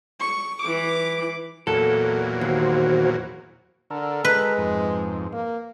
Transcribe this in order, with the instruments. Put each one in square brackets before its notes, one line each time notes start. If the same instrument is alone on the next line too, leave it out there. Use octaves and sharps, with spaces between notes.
[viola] C#6
E3 D6
[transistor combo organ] E2 A#2 F#3 [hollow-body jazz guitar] A4
[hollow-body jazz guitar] D#2 [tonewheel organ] F#4 C5
[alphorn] D3 [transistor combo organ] A4 A#4
[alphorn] G#3 [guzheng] B4
[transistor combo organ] F2 G#2
[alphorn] A#3